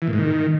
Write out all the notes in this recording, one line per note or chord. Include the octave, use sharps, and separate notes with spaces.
E3
A#2
G#2
D#3